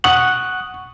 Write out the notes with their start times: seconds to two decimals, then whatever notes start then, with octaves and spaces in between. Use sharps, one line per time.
0.04 F#5 C#6 D#6 F#6 F#7